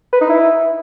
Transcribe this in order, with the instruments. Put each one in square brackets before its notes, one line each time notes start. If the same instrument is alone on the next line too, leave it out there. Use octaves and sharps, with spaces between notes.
[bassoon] B4
D#4
E4